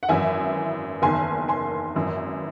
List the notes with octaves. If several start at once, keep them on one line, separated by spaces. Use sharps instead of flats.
F#5
G#1 F#2 E3 E5 G#5
F#1 E2 D#3 G#5 C6
G#5 C6
G#1 F#2 E3